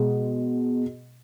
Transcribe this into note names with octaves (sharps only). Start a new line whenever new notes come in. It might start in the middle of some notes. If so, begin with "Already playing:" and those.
Already playing: B2 G#3